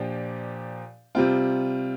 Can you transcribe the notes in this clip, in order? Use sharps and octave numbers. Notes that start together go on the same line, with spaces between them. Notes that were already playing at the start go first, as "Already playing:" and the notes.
Already playing: A#2 F3 D4 G4
C3 G3 C4 F4